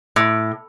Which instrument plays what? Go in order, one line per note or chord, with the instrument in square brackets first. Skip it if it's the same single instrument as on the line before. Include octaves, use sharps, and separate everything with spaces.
[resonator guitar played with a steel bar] A2